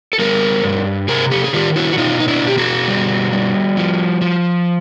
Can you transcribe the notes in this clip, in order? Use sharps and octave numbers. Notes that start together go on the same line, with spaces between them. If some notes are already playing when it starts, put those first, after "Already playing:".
A4
G3 G#4 A#4
G2
C3 G#4 A#4
G4 A4
G#4
D#3 F4 G4
E4 F#4
F#4
B2 D#4 F4
D#4
D4 E4
B2 G4
F#4 G#4
G3
G3
F3
F3